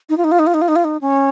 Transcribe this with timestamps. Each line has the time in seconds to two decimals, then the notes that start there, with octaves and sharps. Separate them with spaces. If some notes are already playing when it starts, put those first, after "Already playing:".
0.09 D#4
0.17 F4
0.24 D#4
0.32 F4
0.39 D#4
0.47 F4
0.54 D#4
0.62 F4
0.68 D#4
0.76 F4
0.84 D#4
1.01 C#4